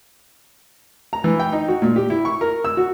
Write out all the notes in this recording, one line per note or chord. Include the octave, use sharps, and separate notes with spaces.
A#5
E3
G5
D#4
F#4
A#2
G4
E4
C#6
A#4
E6
F#4